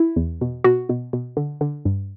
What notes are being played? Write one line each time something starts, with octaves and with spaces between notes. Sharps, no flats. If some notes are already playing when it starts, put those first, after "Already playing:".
Already playing: E4
E2
B2
B2 F#4
B2
B2
D3
D3
G2